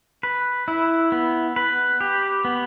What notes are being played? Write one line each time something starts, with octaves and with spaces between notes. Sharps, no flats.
B4
E4
B3
B4
G4
B3